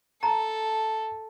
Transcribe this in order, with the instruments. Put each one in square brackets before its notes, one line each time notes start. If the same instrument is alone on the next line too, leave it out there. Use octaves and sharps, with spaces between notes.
[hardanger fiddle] A4 [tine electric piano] A5 [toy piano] A#5